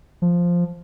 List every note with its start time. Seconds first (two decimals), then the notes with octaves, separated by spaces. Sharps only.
0.22 F3